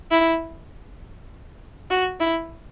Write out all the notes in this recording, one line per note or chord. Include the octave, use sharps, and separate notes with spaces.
E4
F#4
E4